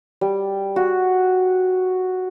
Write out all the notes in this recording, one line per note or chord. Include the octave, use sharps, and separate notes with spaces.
G3
F#4